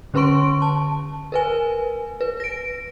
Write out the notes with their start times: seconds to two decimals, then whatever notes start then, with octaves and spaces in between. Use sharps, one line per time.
0.14 D3 C#4 B4 C6 C#6 D7
0.62 A5
1.32 A#4 B4 G#5
2.21 B4
2.40 A#6 D7